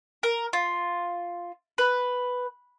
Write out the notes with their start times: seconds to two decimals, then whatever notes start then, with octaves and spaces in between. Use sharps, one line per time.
0.23 A#4
0.53 F4
1.78 B4